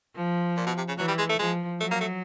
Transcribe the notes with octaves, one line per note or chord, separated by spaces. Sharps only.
F3
A#2
B2
C3
C#3
E3 F#3
G3
G#3
A3
F3 G#3
F#3 A3
A#3
A3